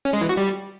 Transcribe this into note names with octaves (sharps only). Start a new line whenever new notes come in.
C#4
G#3
E3
F#4
G3